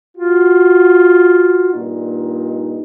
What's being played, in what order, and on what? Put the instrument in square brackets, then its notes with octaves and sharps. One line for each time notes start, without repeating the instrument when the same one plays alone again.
[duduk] F4 [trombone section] F#4
[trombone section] G2 A#2 D#4